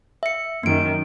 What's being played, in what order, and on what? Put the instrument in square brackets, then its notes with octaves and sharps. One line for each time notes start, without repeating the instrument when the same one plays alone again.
[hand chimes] E5 C#7
[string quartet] F#2 D#3 [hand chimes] A#3 D7